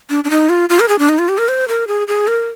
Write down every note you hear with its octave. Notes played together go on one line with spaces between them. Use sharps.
D4
D4
D#4
F4
F4
A#4
G#4
D4
D#4
F4
G4
A#4
C5
A#4
G#4
G#4
A#4